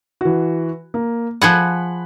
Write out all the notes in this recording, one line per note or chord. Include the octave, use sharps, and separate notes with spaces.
E3 F#4
A#3
F3 G#4 F#5 B5 F#6